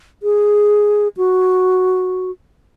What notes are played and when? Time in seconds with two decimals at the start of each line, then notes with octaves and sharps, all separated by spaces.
0.23 G#4
1.17 F#4